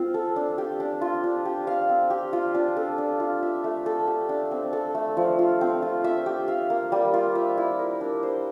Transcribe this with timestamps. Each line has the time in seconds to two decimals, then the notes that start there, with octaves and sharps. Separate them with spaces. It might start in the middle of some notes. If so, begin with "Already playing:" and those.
Already playing: C4 F4
0.14 A4
0.36 D4
0.58 G4
0.80 D4
1.01 F4
1.24 D4
1.45 G4
1.67 F5
1.89 C4
2.10 G4
2.33 F4
2.55 D4
2.77 A4
2.98 D4
3.20 F4
3.43 E5
3.64 A3
3.86 A4
4.07 G4
4.29 D4
4.51 C4
4.73 A4
4.95 A3
5.17 F3
5.39 F4
5.61 C4
5.82 F4
6.04 E5
6.26 G4
6.48 F5
6.70 A#3
6.92 G3
7.14 F4
7.35 E5
7.58 E4
7.79 A#4
8.01 D4
8.23 C5